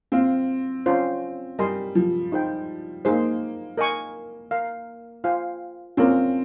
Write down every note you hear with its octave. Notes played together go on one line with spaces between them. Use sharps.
C4 F4 C5 F5
C#4 F4 C5
G3 A#4 D#5 G#5 C6
F3
D#4 G#4 C5 G5
A#3 D#4 G#4 C5
A#4 D#5 G#5 C#6
A#4 F5 A#5
F4 C5 F5 G#5
C4 C#4 F4 A#4